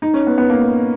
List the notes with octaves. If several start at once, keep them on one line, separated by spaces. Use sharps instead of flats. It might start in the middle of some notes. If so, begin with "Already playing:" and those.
D#4
C#4
B3
B3
A#3